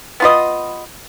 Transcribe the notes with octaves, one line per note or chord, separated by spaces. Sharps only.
B3 F4 B4 D#5